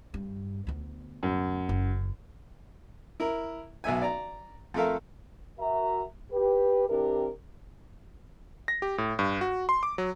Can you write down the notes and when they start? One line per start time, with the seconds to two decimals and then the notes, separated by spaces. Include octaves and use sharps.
0.14 G2
0.67 D2 B3
1.23 F#2
1.69 F#1
3.20 E4 A#4
3.84 B1 B3 E5 G#5
4.01 D5 A#5
4.74 F2 A3 A4 A#4 E5 F5
5.59 F#4 A#4 E5 A#5
6.32 G4 B4
6.89 E3 C4 D4 E4 G4 A#4
8.68 A#6
8.82 G4
8.98 A2
9.19 G2
9.41 F#4
9.69 C6
9.83 D6
9.98 F#3